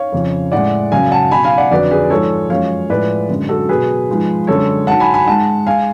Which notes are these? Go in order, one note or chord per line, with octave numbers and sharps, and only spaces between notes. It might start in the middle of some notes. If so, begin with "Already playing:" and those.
Already playing: C#5 F5
F2 C#3 F3
A2 G#3 D5 F#5
F#2 C#3 F#3 F5 G#5
F#5 A5
B2 F#3 G#5 B5
F5 G#5
D5 F#5
F2 D3 F#3 B4 D5
G#4 B4
G#2 F3 G#3 A4 C#5
F#2 F3 G#3 C#5 F5
A2 F3 G#3 B4 D5
F#2 D3 G#3
F#4 A4
B2 F#3 G#4 B4
G#2 F3 G#3
F#2 D3 G#3 A4 C#5
G#2 F#3 F#5 A5
G#5 B5
G#5 B5
G#2 G#3 F#5 A5
G#3 F5 G#5